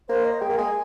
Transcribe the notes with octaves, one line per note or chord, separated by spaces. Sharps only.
A#3 C5
D#5
G#3 G5
A#3
G#3 G#5